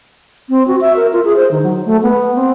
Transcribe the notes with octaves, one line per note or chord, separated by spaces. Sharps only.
C4
F#4
E5
A#4
F4
G#4
C5
D#3
F#3
A3
B3
C4